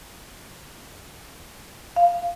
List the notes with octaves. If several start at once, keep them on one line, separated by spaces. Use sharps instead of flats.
F5